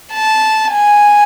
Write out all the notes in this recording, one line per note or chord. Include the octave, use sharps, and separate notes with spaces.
A5
G#5